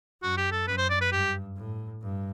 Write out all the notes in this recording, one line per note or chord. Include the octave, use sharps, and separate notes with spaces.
F#2 F#4
G4
A4
F#2 B4
C5
D5
B4
G2 G4
A2
G2